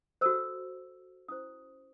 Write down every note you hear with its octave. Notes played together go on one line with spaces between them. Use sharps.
F#4 A4 C5 E6
C#4 E4 C5 D#6